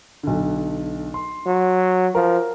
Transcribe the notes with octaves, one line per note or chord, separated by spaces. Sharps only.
B1 D3
C6
F#3
F3 A#4